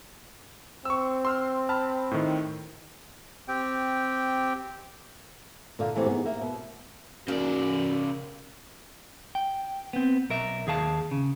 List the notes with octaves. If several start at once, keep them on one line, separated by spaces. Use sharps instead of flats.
C4 C#6 E6
C6 E6 F6
A5 B5 F6
A2 D#3
C4 G4 G5
A#2 D3 F5
A2 C3 D#3 E3 A3 A#3
B3 D#4 G#4
A#3 E5
B2
C#3 A#3 F#4 D5
G5
B3 C4
B1 A#4 E5
D#2 G#4 F5 A5
C#3